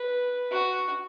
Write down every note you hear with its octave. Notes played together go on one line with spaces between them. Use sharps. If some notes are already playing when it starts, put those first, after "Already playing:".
Already playing: B4
F#4